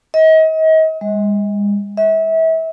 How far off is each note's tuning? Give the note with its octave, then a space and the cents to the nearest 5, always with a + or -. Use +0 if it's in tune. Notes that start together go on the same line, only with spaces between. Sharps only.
D#5 +35
G#3 -40
E5 -30